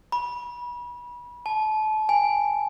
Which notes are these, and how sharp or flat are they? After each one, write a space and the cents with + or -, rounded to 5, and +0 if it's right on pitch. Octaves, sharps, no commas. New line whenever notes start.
B5 -30
A5 -30
G#5 -25